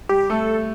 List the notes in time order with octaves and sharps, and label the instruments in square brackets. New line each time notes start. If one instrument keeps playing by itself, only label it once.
[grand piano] G3 [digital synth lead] G4
[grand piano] A3 [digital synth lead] A4